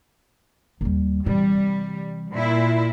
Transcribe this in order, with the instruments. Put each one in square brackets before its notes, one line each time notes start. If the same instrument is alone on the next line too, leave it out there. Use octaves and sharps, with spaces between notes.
[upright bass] D#2 G3
[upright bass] C3 E3 [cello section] G3
[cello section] A#2 E4